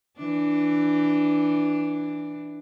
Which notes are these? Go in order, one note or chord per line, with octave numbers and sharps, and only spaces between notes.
E3 D4